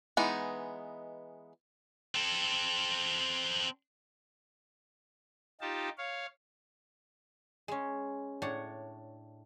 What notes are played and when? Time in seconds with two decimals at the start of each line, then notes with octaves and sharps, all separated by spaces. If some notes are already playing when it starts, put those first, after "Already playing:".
0.17 E3 G#3 B3 D#4
2.15 C4 A4
5.61 D#4 F4 G4 A5
5.98 C#5 F5
7.68 G#3 C#4
8.42 A2 D4 C#5 F#5